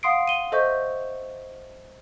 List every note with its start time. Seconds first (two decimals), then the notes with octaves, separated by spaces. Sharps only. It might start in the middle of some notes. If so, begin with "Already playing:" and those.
0.03 F5 F#5 C6 D#6 C7 D7
0.27 D#7 G7
0.52 A4 C5 D#5 E5 C#6 G6